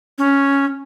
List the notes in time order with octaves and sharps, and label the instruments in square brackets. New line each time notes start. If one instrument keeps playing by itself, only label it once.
[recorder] C#4